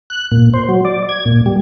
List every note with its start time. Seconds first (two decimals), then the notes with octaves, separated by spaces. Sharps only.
0.10 F#6
0.32 A#2
0.54 C5
0.69 F#3
0.85 D5
1.09 G#6
1.26 A#2
1.46 G3